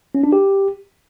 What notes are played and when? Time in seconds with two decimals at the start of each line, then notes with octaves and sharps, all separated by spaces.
0.15 C#4
0.24 D4
0.32 G4